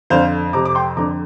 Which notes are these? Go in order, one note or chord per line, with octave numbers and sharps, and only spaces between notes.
F2 D3 C5 F5
F2 C3 A#5 D6
D6
G5 C6
F2 D3 A#5 D6